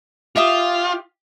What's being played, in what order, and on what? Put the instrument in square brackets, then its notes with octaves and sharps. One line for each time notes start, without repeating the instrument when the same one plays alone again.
[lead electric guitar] F4 [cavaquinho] G4 E5 D#6